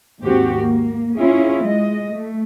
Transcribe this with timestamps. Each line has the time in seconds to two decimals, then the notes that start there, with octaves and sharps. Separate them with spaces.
0.22 D#2 G#2 C4 F#4 G4
0.57 A#3
1.18 C#4 E4 F4 G#4
1.64 G#3 D#5
2.13 A3